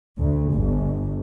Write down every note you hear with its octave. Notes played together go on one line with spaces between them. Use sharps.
D2
G1